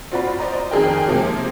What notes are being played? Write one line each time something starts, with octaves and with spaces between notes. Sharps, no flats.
C4 F4 F#4 D5 B5
C5 D5 D#5 A#5
F2 D#3 G#4 A#4 G5
C3 F3 G#3 A#3